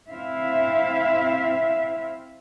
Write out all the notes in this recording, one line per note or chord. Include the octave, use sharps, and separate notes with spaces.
C4 E4 E5 F5